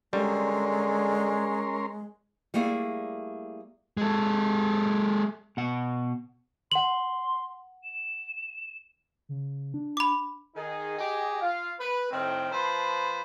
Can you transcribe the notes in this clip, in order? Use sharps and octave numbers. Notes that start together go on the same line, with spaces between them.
D3 G3 G#3 C#4 A#4 C6
G3 A3 A#3 E4 G#4 D5
G#3 A4
B2 F#5
F#5 C6 F#7
E7
C#3
D4
B5 D6
D#3 D#4 G#4
G4 G#4 D#5
F4 F5
B4
A2 D#3 C4
F3 B4 C5 A5 B5 C6